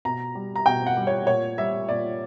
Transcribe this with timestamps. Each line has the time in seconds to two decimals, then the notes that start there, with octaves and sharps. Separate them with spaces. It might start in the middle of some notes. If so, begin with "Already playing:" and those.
0.05 B2 A#5
0.35 G3
0.56 A#5
0.66 B2 G5
0.86 F#5
0.97 G3
1.07 C#5
1.27 A#2 C#5
1.58 G3 E5
1.89 A#2 D5